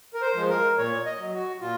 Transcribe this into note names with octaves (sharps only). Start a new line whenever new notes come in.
A#4
C5
F3 G#3
A#4
A#2 C#5
D#5
F#3
F#4
A#2 F4